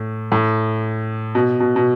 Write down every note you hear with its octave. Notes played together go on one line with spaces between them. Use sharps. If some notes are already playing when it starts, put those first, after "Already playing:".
Already playing: A2
A2
B2
B2
B2